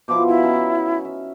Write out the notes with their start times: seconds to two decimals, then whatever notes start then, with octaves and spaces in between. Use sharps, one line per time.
0.08 B2 F3 E4 D6
0.27 E4 F#5
0.43 C#4 D#4 E5
1.05 E5